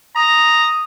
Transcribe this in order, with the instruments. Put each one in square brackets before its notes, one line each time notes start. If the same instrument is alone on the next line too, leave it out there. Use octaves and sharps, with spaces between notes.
[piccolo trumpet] A#5 [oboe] D#6